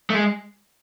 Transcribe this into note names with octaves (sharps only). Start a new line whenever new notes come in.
A3
G#3